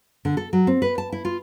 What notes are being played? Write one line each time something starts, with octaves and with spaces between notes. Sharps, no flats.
D3
A4
F#3
C4
B4
A5
E4
F4